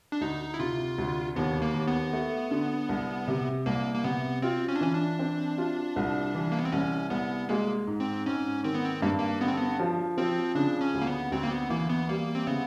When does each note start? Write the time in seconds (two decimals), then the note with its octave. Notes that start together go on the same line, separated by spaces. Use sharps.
0.12 D4
0.21 D2 D#4
0.54 E4
0.59 C3 F4
0.98 D2
1.36 D#2 B3
1.62 A#3
1.74 D#2
1.87 B3
2.13 A3
2.51 D3
2.89 C2
3.28 C3
3.66 C2 A#3
3.95 A#3
4.04 C3 B3
4.42 C4 F4
4.68 C#4
4.76 D4
4.81 E3 C#4
4.93 D4
5.19 C4
5.58 F4
5.96 C2
6.35 E3
6.52 A#3
6.59 B3
6.65 C4
6.72 C2 C#4
7.10 C2 B3
7.49 G#3 A#3
7.87 G#2
8.00 C4
8.26 G#2 C#4
8.63 D#3 C4
8.74 B3
8.85 C4
9.02 G2 A#3
9.19 A#3
9.40 D3 B3
9.48 C4
9.57 B3
9.80 F3
10.18 F3 C4
10.55 C#3 D4
10.81 C#4
10.94 D2
11.02 A#3
11.07 B3
11.32 D2 C4
11.43 A#3
11.51 B3
11.70 E3 A#3
11.89 B3
12.09 G3 A#3
12.35 C4
12.47 C#3 B3